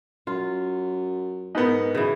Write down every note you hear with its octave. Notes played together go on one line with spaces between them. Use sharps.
F#2 F4
G#2 B3 A#4 B4 D#5
F#2 C#3 E3